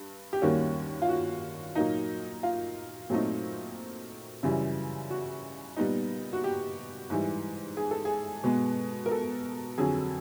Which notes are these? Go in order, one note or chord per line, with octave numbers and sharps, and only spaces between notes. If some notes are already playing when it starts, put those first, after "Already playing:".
Already playing: G2
G4
D#2 D#3 G3 A#3 C#4 F#4
F4
F#4
A#2 F#3 A#3 D#4
F4
A#2 F#3 A3 C4 D#4
F#2 C#3 E3 G3
F#4
A#2 G3 B3 D#4
F#4
G4
G#2 E3 G3
G#4
A4
G#4
B2 G#3 B3
A#4
A4
F2 D3 F#3 G#4